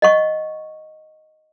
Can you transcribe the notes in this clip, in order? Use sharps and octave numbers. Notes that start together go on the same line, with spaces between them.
D#5 F#5 C#6